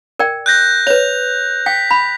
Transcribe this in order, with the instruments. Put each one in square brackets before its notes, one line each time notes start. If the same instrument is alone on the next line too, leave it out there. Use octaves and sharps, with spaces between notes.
[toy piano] A#4 D5 G5
[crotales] F#6 G6 A#6
[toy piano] B4 C#5 [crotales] F7
[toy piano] G5 [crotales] B6
[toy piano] B5